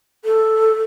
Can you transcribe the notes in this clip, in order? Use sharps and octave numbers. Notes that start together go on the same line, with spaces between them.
A4